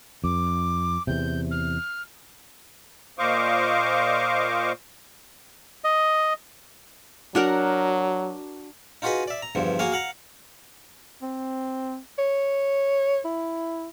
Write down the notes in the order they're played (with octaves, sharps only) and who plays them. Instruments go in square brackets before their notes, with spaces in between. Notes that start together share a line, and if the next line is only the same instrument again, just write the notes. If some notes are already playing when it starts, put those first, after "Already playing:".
[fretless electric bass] F2 [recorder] D6
[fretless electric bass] E2 C3 [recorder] G6
[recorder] F6
[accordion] A#2 C5 D#5 F5 C#6 D6
[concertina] D#5
[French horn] F#3 [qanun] D4 F#4 A#4
[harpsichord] D#4 F4 F#4 G#4 B4 D#5
D5 E5
A#5
E2 G2 D3 F3
A#3 F#4 G#4 F5
F5 F#5 A#5
[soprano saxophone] C4
C#5
E4